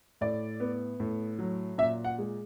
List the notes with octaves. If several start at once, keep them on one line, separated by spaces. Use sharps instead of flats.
A2 D5
B3
A2
F#3
A#2 E5
F#5
G#3